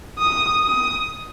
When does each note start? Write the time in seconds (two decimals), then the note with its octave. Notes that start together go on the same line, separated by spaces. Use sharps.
0.19 D#6
0.63 D#6